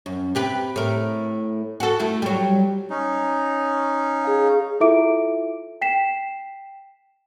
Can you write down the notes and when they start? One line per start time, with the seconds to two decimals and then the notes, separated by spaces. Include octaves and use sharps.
0.06 F#2
0.35 C3 G4 B4
0.76 A2 A#4
1.80 F#4 A4
2.00 A3 E4
2.22 F#3 G3
2.90 C#4 D#4
4.24 G#4 F5
4.80 E4 F4 A4 E5 D6 D7
5.81 G5 B6 C7 E7